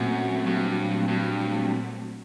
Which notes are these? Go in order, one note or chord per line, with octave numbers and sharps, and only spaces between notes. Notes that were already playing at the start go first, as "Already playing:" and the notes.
Already playing: F#2 A#2 F#3 A3 C4 F#4
G2
G2